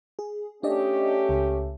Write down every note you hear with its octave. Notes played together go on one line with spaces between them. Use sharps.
G#4
A3 C#4 D4 G4 D5 D#5
C#2